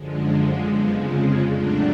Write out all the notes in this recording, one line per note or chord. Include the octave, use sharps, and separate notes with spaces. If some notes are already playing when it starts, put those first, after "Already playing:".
Already playing: F#2 D3 F3 G#3
F2 C#3 F3 G#3 B3
C#4
A2 F#3 A3 D4